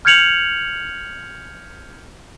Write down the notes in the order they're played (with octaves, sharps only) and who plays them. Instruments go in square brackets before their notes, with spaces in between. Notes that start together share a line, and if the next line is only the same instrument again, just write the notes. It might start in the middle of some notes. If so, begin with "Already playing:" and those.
[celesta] F6 G6 G#6 C#7 F7 F#7